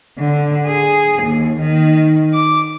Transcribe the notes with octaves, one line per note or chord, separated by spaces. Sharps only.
D3
G#4
D#2
D#3
D6